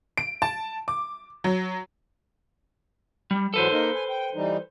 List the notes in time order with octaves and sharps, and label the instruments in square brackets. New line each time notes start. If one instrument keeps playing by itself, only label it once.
[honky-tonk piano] D7
A5
D6
F#3
[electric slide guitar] G3
[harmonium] G#2 E3 F#3 [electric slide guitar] A4 B4 C5
[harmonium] A#3 D#4 A#4
G#5
G5
E3 G3 D#4